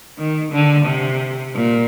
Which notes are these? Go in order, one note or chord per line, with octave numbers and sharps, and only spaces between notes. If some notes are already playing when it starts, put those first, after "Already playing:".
D#3
D3
C3
A#2